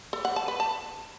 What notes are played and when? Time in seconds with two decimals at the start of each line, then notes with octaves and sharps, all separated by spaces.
0.13 A4
0.25 F#5
0.36 A5
0.48 B4
0.60 A5